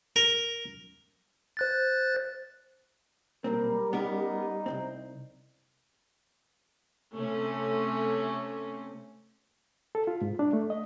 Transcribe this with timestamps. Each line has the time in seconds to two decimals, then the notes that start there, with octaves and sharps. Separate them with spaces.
0.16 A#4
1.57 C5 F#6 A6
3.44 B1 A#2 G3 C4 A#4
3.93 B3 C#4 D#4 A#4
4.66 C2 F#2 C4
7.16 C3 A3 C#4
9.95 A4
10.07 F4
10.21 G#2
10.39 D4
10.53 A3
10.70 D#5